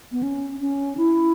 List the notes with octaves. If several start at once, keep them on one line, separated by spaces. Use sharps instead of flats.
B3
C#4
C#4
E4